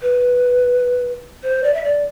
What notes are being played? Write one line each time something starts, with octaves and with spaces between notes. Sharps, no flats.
B4
C5
D5
E5
D5